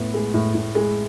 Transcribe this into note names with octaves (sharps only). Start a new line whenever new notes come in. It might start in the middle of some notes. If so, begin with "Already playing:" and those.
Already playing: A2 B3
G#3
A2
A2
G#3